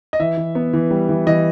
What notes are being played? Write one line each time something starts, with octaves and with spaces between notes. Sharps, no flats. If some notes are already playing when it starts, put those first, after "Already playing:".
D#5
E3 E5
E3
B3
E3
G3
E3
E3 D#5